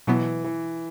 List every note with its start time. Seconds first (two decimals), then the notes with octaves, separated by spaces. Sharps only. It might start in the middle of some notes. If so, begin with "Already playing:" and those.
0.07 B2 E3 F#3 B3
0.44 E3